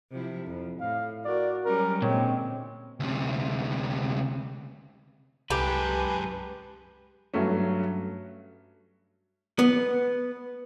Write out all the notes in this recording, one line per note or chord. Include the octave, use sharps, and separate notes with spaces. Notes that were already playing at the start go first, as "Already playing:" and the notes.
C3 F3 E4
F2
A2 F5
F#4 A#4 D5
F#3 G3 C#4 A#4
A#2 D3 G#3 C4 C#5
D2 C3
C2 F#2 G#3 G4 B4 A5
G2 F#3 A3 C#4
B3